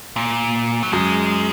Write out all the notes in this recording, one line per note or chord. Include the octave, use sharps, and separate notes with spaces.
A#2
F#3
F#2 G#3